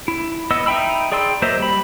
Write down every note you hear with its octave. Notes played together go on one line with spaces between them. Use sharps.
E4
B3 D#5 E6
D#4 E5 G5 B5 E6
G#4 D5 G5 C6 E6
F#3 A#3 C5 D#5 E5
G3 B5